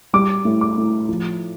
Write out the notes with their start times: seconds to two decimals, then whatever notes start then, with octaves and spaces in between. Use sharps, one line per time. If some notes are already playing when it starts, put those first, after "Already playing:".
0.13 G3 D6
0.45 A2
0.61 D6
0.78 A2
1.09 F3